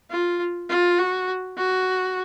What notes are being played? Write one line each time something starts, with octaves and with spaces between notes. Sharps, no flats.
F4
F4
F#4
F#4